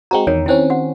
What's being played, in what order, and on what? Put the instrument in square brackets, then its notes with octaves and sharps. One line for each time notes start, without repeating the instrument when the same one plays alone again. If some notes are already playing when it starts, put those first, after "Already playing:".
[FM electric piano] G#3 C4 F#4 [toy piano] G5 A#5
[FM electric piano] E2 D#3 [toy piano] C#5
[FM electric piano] D#3 C4 C#4 [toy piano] E4 C5
[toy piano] F#4 F#5